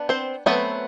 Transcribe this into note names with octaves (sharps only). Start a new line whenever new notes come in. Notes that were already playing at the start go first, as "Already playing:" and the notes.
Already playing: B3 D4
C4 C5
F#3 A3 B3 C4 B4